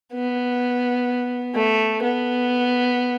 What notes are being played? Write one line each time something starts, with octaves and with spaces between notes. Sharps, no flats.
B3
A3
B3